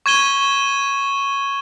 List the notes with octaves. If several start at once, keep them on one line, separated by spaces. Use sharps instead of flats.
C#6 G#6 D#7 G7